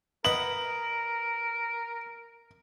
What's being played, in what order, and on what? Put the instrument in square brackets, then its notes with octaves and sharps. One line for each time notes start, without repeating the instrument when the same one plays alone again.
[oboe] A#4 [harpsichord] B4 D#5 F#5 [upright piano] F#7